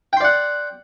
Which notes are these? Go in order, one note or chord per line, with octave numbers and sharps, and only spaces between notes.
D5 F#5 G5 C6